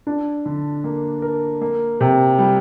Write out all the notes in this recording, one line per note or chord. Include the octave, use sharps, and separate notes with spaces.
D4
D3
A#3
A#4
A#3
C3
G3